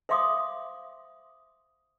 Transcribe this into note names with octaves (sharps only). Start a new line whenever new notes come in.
C5 E5 F5 C6 D6 D#6